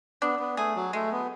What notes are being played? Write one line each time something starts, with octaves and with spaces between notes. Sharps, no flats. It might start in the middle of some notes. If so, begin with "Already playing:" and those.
B3 D4
B3
A3 G#4
F#3
G#3 A3
B3